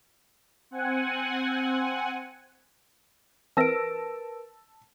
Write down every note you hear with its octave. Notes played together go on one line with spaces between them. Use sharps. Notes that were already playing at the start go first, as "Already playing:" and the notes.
C4 F#5 G#5
E3 C4 A#4 B4 A5 E6 A#6 D7